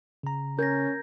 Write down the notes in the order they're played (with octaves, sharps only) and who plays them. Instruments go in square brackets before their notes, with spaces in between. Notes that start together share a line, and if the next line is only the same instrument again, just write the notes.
[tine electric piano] C#3 A#5
[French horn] C#4 [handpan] A#4 [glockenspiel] G6 G#6 A#6